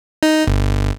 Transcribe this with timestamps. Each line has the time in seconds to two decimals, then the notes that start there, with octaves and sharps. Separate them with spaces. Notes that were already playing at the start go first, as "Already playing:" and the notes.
0.23 D#4
0.47 G1